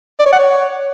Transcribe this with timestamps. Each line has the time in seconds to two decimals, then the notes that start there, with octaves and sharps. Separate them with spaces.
0.19 D5
0.26 C#5
0.32 F#5
0.39 C#5